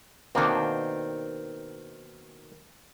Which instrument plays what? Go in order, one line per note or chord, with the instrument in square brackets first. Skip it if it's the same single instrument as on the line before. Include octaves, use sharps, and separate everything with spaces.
[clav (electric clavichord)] B2 A#3 D4 [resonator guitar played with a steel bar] D#3 C4